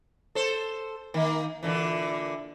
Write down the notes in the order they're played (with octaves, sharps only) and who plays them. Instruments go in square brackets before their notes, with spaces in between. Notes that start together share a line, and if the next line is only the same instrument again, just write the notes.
[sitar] A4 C5
D#3 A#3
A#2 D3 E3